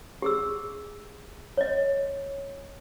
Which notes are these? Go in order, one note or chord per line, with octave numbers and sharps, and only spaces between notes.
G4 G#4 E6
C#5 D#5